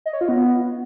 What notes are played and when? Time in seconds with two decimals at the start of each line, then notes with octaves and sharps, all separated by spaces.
0.06 D#5
0.13 C#5
0.21 F4
0.29 B3